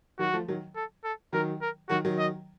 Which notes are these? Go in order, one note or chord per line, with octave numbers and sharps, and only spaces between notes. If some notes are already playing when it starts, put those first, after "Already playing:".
D#3 F#3 F#4
F3 A3
D#3 F#3
A4
A4
D#3 F#3 A#4
A#4
D#3 F#3 F#4
D#3 F#3
D#5